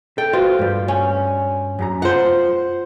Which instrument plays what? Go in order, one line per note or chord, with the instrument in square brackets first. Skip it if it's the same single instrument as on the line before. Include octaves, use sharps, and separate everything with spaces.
[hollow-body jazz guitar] A4 [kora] G5
[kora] F4 [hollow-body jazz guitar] F#4 B4 C5
[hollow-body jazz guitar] G2 G3
[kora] C#4
[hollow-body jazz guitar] F#2 G4 A#5
[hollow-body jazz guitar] F4 [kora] C5 F#5